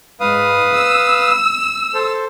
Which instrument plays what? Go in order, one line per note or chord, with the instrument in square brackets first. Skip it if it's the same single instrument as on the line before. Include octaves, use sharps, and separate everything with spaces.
[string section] G#2 [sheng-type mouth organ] B4 F5 D#6
[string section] E6
[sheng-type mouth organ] A4 C5